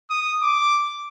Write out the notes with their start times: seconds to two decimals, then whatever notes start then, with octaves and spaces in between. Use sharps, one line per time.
0.10 D#6
0.41 D6